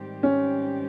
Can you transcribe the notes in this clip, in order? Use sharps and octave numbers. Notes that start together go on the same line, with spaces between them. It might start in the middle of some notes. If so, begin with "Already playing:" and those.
Already playing: G#2 D#3 G3 C4 G4
C#4